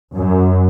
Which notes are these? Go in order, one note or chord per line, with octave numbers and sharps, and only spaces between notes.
F#2